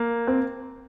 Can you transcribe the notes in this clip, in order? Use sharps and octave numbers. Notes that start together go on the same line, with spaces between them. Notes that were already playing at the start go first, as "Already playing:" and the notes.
Already playing: A#3
C4